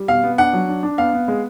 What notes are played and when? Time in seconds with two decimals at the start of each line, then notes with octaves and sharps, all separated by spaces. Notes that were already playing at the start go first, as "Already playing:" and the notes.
Already playing: G3
0.08 B2 F5
0.23 B3
0.38 D4 F#5
0.53 F#3
0.68 D4
0.83 D4
0.98 B3 F5
1.13 B3
1.28 G#3